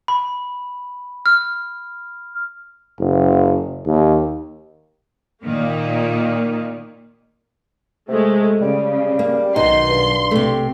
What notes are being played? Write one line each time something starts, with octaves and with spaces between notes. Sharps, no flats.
B5
F6
F#1
D#2
A#2 D#3 A#3
C3 G#3 A3
C#3 G3
A#3
B1 B2 D#3 D#4 C6
G2
C3 A3